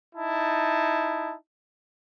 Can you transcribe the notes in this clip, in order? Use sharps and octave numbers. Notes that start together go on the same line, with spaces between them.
D#4 E4 A5